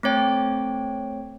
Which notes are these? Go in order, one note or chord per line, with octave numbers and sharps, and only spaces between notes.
A3 C4 C#5 G5